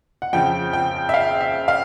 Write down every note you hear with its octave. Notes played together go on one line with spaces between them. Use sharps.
F#5
F2 C#3 F3 G5
G5
E5
F5
E5
F5